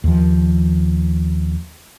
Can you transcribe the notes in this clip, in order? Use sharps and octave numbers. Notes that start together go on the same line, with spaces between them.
D#2 F3